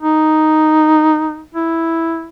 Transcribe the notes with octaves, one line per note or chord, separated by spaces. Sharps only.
D#4
E4